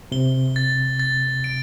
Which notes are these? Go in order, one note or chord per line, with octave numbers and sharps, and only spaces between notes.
C3 G7
A6
A6
D7